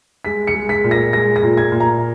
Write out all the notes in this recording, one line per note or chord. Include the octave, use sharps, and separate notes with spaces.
G#3 B6
C#7
G#3
B6
A#2
A#6
G#3 A#6
A#6
A#2
G#6
A#2
A#5